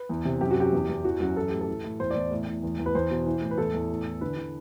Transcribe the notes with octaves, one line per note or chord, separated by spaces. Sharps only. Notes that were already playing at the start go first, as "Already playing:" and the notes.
Already playing: B4
E2
C3
F#2 G4
F#4
F#2 G4
E2
E2
E3 F#4
F#2 F#4
E3 A4
A2 G4
A4
E3
A2
E2 C5
E2 D5
A2
A2
E2
E2
B4
E2 C5
B2
E3
A2
B4
E2 A4
E2
A2
E3
D3 B4
D3